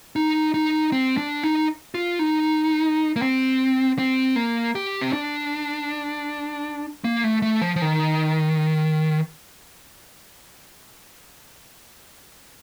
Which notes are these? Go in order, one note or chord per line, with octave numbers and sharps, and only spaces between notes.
D#4
D#4
C4
D4
D#4
F4
D#4
A#3
C4
C4
A#3
G4
C4
D4
A#3
A3
A3
F3
F3
D#3